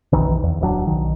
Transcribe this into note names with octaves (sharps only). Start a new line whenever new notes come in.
F#1 B1 D#3 E3
E2
D1 G2 F#3 D4
B1 D#3